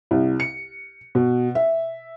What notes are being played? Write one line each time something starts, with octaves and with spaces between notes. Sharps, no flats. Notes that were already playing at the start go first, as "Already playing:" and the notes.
C2
C#7
B2
E5